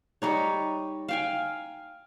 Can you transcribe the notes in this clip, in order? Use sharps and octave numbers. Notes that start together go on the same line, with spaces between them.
G3 D#4 C#5
F5 G5 G#5